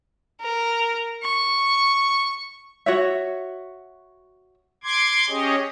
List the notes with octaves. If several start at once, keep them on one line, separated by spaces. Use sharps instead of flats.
A#4
C#6
F#4 C#5 E5
C6 D6 G#6
C#4 G4 G#4 C#5 D#5